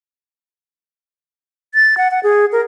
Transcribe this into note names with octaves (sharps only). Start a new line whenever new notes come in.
A6
F#5
F#5
G#4
A#4